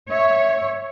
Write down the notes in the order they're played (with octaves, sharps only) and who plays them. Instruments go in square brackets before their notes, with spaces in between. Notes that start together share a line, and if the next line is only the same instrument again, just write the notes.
[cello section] C#5 [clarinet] E5